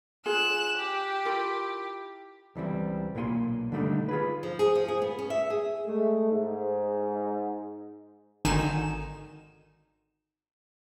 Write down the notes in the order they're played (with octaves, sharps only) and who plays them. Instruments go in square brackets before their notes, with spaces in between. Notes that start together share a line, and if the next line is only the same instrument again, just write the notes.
[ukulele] F4 G#4 G#5 [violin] F#6 E7
[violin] G4
[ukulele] E4 F4 A#4
[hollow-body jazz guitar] C#2 E3 G3 C4
B1 A#2 A#3 F4 G#5 C6
D3 D#3 G3 A3 C4 D#4
F4 G#4 B4
[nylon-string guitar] F3
G#4
F3
G#4
B3
C#4
E5
G#4
[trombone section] G#3 A3
G#2
[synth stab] G#1 D3 D#3 D#4 G#5 E7